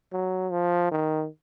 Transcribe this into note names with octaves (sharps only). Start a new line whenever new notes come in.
F#3
F3
D#3